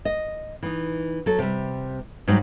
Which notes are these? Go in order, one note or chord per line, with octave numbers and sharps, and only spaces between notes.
D#5
E3 D#4
F#3 A4
C3 G3
G#2 F#3 G3 D#4